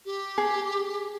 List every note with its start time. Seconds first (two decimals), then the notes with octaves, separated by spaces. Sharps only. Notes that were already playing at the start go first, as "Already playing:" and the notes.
0.05 G4
0.38 G#4